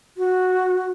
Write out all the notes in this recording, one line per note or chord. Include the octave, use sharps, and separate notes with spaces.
F#4